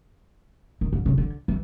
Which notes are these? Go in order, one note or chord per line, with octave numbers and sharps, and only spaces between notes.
D#3
D3
C#3
D3
E3